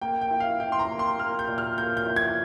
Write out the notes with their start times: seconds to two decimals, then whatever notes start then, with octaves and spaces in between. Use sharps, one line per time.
0.01 A#3 G5
0.21 G5
0.31 E4
0.40 F5
0.60 E4 G5
0.72 C6
0.79 A#5
0.89 A#3
0.99 C6
1.19 A#3 F6
1.39 G6
1.48 A#2
1.58 F6
1.78 A#3 G6
1.97 G6
2.07 E4
2.16 G#6